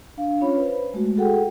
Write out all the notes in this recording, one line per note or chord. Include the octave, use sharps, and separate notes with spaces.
D4 F5
C#4 F4 C#5 B5
B4 C5
G#3 A3 F#4
F#4 G#4 A4 F#5 G5